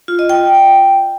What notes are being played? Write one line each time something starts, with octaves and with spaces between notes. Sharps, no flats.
F4
D#5
G5